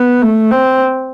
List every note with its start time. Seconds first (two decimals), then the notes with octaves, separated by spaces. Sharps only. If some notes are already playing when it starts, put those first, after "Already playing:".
Already playing: B3
0.22 A3
0.51 C4